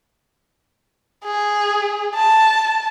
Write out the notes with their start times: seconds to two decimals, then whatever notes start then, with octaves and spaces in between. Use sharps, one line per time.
1.25 G#4
2.15 A5